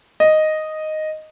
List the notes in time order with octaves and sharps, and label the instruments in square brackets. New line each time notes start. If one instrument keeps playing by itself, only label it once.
[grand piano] D#5